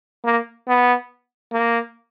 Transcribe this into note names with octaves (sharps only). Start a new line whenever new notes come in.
A#3
B3
A#3